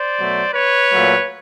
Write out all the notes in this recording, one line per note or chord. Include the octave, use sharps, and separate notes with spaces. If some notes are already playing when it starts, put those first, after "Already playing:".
Already playing: C5 D5
B2 F#3 A3
B4 C#5
A#2 F#3 A3